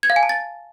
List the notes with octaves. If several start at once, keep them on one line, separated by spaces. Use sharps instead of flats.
G#6
F5
G#5
A5
A6